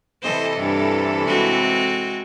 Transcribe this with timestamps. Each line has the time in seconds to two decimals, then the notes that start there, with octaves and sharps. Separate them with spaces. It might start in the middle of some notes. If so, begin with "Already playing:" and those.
0.23 C3 E3 A4 C5 D#5
0.57 G2
1.28 G#3 C4 F#4